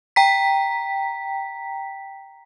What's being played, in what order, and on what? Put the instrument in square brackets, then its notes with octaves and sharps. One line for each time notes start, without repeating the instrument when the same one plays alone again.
[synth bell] G5 A#5 B6